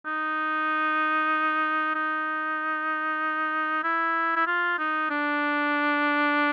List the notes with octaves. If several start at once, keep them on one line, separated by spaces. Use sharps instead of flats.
D#4
D#4
E4
E4
F4
D#4
D4